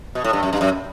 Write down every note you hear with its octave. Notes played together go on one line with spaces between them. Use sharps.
B2
A2
G2
F#2
G2
F#2